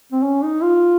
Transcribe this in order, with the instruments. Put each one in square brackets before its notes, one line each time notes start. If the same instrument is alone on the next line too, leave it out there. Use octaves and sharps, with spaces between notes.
[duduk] C4
C#4
D#4
F4